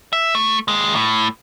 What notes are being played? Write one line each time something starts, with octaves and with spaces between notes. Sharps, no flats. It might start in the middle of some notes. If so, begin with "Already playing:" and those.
E5
A3
D#2 G#3
A2